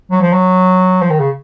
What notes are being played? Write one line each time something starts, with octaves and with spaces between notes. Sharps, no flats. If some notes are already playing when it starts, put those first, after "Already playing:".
F#3
F3
F#3
F3
D#3
C#3